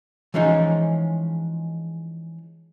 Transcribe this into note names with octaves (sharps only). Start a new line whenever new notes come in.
E3 F3 G#3 C#4 D#4 F4